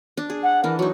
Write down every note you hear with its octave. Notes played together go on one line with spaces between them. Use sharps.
D4
G#4
F#5
E3 D4 A#4
F#3 D#4 C#6